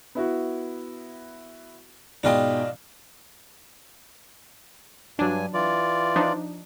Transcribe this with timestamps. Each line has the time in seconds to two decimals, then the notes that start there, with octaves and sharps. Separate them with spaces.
0.15 B3 E4 F#4
2.24 G#2 B2 D4 F4 D#5 G5
5.19 G2 F#3 D4 G#5
5.54 E3 F4 D5
6.16 F3 D4 D#4